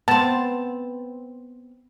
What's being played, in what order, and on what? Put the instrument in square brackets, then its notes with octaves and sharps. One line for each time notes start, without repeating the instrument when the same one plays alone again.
[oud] B3 C4 [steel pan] A5